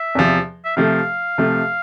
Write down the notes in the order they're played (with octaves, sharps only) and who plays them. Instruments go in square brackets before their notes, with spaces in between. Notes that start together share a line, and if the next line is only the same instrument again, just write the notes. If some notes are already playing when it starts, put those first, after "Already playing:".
Already playing: [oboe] E5
[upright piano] E2 C3 F3
[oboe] E5
[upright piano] C3 F3 A3 [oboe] F5
[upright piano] C3 F3 A3